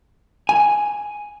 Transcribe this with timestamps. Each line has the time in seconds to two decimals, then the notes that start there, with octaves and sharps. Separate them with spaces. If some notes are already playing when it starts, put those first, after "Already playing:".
0.49 G#5